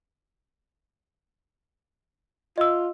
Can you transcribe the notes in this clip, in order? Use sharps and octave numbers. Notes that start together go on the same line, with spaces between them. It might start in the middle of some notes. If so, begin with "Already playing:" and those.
F4 D#5 E6